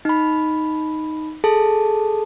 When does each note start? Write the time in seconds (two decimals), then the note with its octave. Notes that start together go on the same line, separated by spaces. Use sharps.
0.05 D#4 B5
1.44 G#4 A4 A5